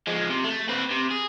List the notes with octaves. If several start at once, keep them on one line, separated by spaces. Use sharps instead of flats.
F3 G#3
C3
A3
C4 B4
C3
G#4